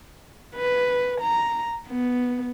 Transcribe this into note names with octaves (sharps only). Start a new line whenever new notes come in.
B4
A#5
B3